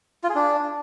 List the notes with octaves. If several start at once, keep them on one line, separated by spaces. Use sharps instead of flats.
F4
G#4
D4